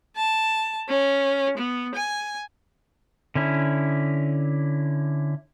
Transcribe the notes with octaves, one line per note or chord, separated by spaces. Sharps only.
A5
C#4
B3
G#5
D3 C#4 E4